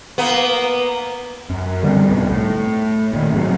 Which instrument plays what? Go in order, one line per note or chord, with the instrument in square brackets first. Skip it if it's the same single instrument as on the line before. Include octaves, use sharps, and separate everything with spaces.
[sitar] A#3 B3
[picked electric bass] F#2
D3 G3 B3 C4
C2 G#2 B2
A2
A#2 D#3
G#2 C3 F#3